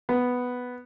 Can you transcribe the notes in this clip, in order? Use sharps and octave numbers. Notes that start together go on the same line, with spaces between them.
B3